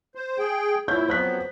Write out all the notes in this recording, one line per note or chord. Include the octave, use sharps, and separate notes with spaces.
C5
G#4 G5
A#2 E4 C#5 G6
F2 F#3 B3 C5 F#6 B6